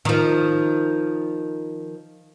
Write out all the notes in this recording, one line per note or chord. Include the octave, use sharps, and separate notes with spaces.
D#3 F3